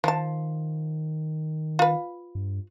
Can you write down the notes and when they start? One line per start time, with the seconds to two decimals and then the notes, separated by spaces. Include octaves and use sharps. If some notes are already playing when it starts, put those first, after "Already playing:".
0.04 D#3 F3 A5
1.79 F4 B4
2.35 G2